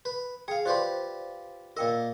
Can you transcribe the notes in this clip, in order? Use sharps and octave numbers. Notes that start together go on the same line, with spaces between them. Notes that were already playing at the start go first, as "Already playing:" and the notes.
B4
G#4 F5 G5
F4 G4 B4 C5 D5 C6
A#2 A#4 D#5 G5